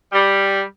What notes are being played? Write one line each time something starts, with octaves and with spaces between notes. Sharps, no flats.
G3